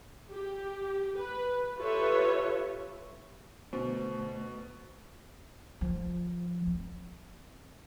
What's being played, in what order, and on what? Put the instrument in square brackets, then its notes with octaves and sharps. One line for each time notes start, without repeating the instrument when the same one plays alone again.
[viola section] G4
B4
F4 G4 A4 B4 C#5 E5
[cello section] D2 [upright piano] B2 [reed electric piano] C5
[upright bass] F3
C4